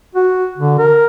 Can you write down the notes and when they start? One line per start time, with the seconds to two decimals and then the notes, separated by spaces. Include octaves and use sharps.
0.15 F#4
0.58 D3
0.79 A#4